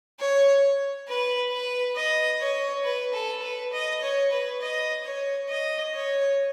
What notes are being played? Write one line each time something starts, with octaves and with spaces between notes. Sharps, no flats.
C#5
B4
B4
D#5
C#5
B4
A4
B4
D#5
C#5
B4
D#5
C#5
D#5
C#5